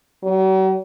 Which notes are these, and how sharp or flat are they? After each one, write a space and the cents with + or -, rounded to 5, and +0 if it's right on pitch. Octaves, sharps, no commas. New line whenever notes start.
F#3 +45